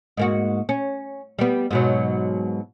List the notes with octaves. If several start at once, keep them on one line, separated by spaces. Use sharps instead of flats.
G#2 A#3 F#4
C#4
G3 B3
G#2 B2 F#3